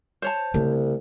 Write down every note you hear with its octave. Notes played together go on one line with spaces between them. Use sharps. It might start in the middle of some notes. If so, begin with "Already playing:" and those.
C5 C#5 A5
C2 C#3 A3